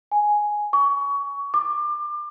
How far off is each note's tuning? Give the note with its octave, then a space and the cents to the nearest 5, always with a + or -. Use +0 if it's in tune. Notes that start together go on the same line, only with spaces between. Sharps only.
G#5 +5
C#6 +25
D6 +30